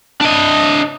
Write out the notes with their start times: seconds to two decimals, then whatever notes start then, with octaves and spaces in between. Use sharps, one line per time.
0.21 D4 D#5